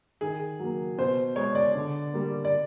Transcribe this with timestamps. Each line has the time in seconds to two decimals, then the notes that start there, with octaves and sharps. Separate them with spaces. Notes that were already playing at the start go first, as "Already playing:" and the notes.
0.21 D#3 G#4
0.59 F#3 A#3
0.98 B2 C5
1.36 G#3 C#5
1.55 D5
1.75 D3
2.13 G3 A#3
2.45 D5